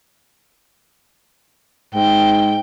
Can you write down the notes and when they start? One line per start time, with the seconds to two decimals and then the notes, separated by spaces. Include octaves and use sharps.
1.95 G#2 G5